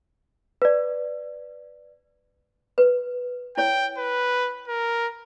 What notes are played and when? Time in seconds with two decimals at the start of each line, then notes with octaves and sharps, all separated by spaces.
0.62 B4 D5
2.78 B4
3.57 E4 C#5 G5
3.98 B4
4.68 A#4